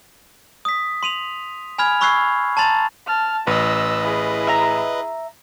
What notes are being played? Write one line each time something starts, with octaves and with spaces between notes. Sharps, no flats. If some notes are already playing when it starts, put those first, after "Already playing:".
D#6 B6
C6 D#7 F7
G#5 B5 F6 G#6 F7
B5 C#6 E6 F#6 G#6 C7
A5 A#5 C6 A6 F7
A5 F6
A1 B4 D#5 E6
E4 G#4
E5 A#5